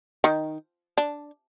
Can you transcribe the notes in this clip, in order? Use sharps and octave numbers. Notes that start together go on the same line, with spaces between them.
D#3
D4